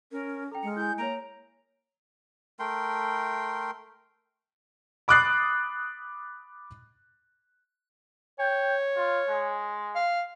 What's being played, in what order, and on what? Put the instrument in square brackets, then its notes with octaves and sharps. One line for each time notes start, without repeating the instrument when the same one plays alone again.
[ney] C#4 [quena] A#4
[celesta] A4 G5 [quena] A#5
[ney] G#3 [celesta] F6 C#7
[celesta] E4 G#5 [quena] G6
[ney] A#3 [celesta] C#5 D7 [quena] A#5
[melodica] A3 A#4 G5 C6
[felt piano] B5 D6 D#6 F#6 A6 C7
[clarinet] C#5 [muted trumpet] G5
[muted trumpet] F4
G#3
[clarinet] F5